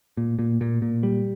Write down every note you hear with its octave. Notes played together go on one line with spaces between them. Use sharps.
A#2
A#2
A#2
A#2
G3